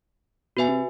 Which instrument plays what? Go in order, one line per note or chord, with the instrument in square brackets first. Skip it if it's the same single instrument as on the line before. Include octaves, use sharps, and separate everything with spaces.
[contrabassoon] B2 [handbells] F#4 B4 E5 G#5
[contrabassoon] C3